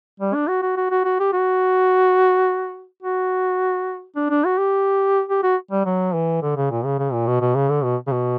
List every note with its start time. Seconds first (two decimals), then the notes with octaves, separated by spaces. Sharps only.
0.20 G3
0.34 D4
0.48 F#4
0.62 F#4
0.77 F#4
0.91 F#4
1.05 F#4
1.19 G4
1.33 F#4
3.03 F#4
4.16 D4
4.30 D4
4.45 F#4
4.58 G4
5.29 G4
5.43 F#4
5.71 G3
5.86 F#3
6.14 E3
6.42 D3
6.56 C#3
6.71 A#2
6.84 C#3
6.99 C#3
7.13 A#2
7.27 B2
7.41 B2
7.55 C#3
7.69 D3
7.83 B2
8.07 C#3
8.12 B2